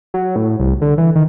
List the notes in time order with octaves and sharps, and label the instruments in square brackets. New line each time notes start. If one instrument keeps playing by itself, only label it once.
[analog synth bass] F#3
A2
C2
D3
E3
D#3